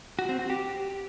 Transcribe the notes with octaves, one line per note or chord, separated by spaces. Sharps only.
F#4
C4
F#4
G4